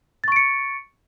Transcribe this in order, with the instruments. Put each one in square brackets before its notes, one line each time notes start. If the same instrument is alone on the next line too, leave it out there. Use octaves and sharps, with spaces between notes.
[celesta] A6
C#6
D7
C#7